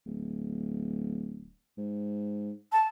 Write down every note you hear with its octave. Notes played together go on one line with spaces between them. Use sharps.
D1
G#2
A5